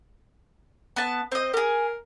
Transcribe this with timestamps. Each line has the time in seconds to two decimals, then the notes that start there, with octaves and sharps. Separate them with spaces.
0.96 B3 A5
1.32 C4 C5 D#5
1.53 G4 G#4 A#4